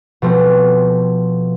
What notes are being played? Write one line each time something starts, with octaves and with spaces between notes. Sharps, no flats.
B2 F3 A3 C4